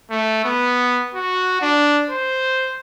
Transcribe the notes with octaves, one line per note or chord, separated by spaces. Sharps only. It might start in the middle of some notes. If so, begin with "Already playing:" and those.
A3
B3
F#4
D4
C5